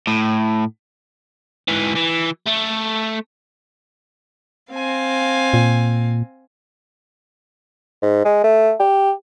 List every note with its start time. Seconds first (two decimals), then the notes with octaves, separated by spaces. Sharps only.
0.07 A2
1.68 G#2 E3
1.95 E3
2.46 A3
4.71 C4 F5 G#5
5.54 A#2
8.02 G#2
8.25 G#3
8.44 A3
8.79 G4